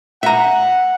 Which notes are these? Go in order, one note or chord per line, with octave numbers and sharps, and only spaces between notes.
E5 F#5 A#5